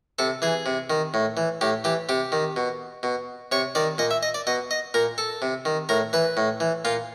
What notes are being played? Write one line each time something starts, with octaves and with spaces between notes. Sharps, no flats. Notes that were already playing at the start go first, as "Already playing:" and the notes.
C3 A4
E3 G#4
C3
D#3
A2
E3
A2 G4
E3 G4
C3 G4
D#3
B2
B2
C3 C#5
D#3 D5
A#2 D#5
E5
D#5
D5
B2 D#5
D#5
A#2 A#4
A4
C3
D#3
A2 A#4
E3 B4
A2
E3
A#2 F4